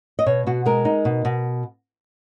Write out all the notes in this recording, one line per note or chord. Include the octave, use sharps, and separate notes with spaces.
D#5
B2 C#5
B2 F#4
G#3 A#4
D#4
B2
B2